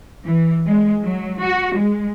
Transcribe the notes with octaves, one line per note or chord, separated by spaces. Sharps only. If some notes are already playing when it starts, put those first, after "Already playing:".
E3
G#3
F#3
F#4
G#3